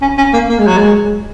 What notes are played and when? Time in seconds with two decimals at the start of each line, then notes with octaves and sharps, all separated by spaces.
0.02 C#4
0.17 C#4
0.33 A#3
0.48 A#3
0.59 G#3
0.67 F#3
0.77 G#3